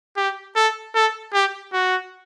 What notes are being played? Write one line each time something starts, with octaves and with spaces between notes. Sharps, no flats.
G4
A4
A4
G4
F#4